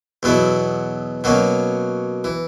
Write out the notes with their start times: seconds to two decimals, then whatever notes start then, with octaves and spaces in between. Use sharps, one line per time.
0.23 E2 B2 F#3 B3 E4
1.24 B2 F#3 A#3 C#4
2.24 E3